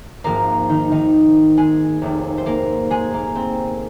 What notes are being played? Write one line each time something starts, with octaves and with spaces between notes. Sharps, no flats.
G#1 G#2 F3 A#3 A#4
D#3 D#4
D#3 D#4
G#3 G#4
F1 D#2 D#3
C5
A#3 A#4
G#3 G#4
A#3
C4